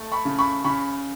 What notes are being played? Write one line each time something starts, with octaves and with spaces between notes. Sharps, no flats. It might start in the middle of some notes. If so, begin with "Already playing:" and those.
Already playing: A3
B5 C#6
C#3
B5 C#6
C#3 B5 C#6